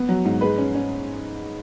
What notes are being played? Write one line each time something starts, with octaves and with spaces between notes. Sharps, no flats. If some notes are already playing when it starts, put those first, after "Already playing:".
Already playing: B3
F#3
G#2
G#3 B4
C#4
C#4